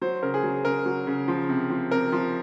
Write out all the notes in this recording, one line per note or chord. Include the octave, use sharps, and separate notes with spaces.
F#3 C5
C#3 A#4
G#4
F#3
C#3 A#4
F#3
C#3
F3
C3
F3
C3 A#4
F3